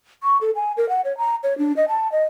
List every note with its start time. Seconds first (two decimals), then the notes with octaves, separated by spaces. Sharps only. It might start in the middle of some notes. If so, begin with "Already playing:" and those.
0.23 C#6
0.41 A4
0.56 G#5
0.77 A#4
0.89 F#5
1.05 C#5
1.18 A#5
1.43 C#5
1.58 D4
1.77 D#5
1.88 A5
2.12 D#5